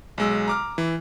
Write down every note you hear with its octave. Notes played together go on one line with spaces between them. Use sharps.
B1 G#3 E6
A#5 D6 F6
E3